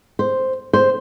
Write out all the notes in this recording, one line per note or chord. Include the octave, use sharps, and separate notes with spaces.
C5
C5